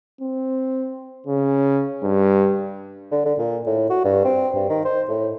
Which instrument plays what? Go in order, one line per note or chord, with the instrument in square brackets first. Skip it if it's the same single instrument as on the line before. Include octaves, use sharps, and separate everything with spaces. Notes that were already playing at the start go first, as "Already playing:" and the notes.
[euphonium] C4
C#3
G2
[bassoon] D3
D3
A#2
A2
F#4
G2
C4
G2
D#3
C5
A2